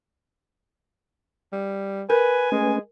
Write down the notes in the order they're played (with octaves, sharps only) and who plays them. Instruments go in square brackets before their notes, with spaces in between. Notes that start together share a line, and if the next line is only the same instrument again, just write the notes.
[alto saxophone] G3
[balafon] A#4 [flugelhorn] B4 [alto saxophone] G#5
[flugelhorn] G#3 [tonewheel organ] A3 C#4 B4